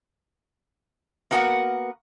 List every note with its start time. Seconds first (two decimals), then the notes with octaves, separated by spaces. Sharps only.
1.31 A#3 B3 F#4 A#4 F#5